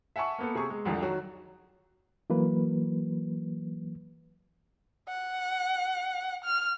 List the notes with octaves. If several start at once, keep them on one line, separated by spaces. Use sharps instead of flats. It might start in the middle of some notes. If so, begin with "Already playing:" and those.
E5 F#5 G#5 A5 C#6
A#3 B3 A4
C3 G#4 C#6
G#3
C2 F2 D3
D#3 F#3 F#4
E3 F#3 A#3 B4
F#5
F6